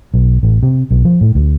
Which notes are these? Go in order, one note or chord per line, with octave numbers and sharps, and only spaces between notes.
B1
A1
C3
B1
F3
A2
D2